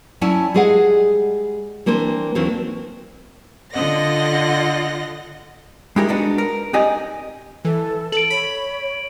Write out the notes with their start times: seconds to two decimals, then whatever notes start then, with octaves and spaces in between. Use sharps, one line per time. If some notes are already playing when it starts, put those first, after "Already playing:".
0.21 F#3 C#4 E4 D5 G#5 A5
0.54 G3 G#3 G#4 D#5 F5 F#5
1.86 E3 A#3 C4 D4 C5
2.35 D#2 E3 F#3 A#3 C4 D4
3.72 D3 F4 D#5 F#5 A#6
5.96 G#3 D#4 E4 G4 G#4 A#4
6.08 G#3 B3 D4 D#4 F#4
6.38 A#4
6.73 C4 D#4 G4 D5 D#5 G#5
7.65 E3 A4
8.12 A4 D7 F#7
8.30 C#5 B5